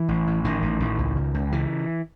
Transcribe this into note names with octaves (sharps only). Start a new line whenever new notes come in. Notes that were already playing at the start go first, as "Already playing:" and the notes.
Already playing: E3
A1
A2
A1 D#3
A1
A1
C#2
C#3
C#2
C#3 E3